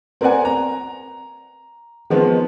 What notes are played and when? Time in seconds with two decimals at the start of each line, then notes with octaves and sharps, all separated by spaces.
0.21 C4 A#4 B4 D5 F#5 G#5
0.45 A#5
2.10 D#3 F3 G#3 B3 C4